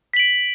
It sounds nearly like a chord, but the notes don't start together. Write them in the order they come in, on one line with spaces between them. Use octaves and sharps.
B6 F#7 D7